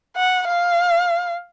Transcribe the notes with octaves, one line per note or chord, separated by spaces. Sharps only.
F#5
F5